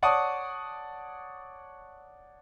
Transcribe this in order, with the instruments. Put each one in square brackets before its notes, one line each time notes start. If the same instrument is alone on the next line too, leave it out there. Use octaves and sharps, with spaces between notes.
[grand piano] C#5 D5 F#5 A5 C#6 D#6